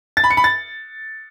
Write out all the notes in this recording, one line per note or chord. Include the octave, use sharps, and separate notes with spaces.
A6
B5
C#7
B5
A6